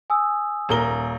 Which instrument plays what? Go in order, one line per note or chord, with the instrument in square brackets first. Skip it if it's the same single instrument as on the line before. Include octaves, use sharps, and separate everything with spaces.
[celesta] G#5 D#6 E6
[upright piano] D#1 A#4 G7